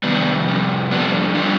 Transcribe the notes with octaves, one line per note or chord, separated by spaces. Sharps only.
F2 C3 D#3 G3 B3 D4
F2 C3 G3
F2 D3 G3 B3 D4
D3 G3 D4 F4